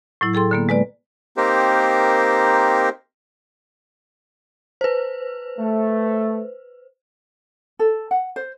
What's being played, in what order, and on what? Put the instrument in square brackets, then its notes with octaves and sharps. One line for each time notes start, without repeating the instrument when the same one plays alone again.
[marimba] A2 F#3 E4
G#4 A4 G5 C6
D3 A#3 B3
G#3 B4 D5
[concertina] A#3 C4 D#4 G4 A#4 C5
[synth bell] B4 C5
[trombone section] A3
[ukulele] A4
F#5
C5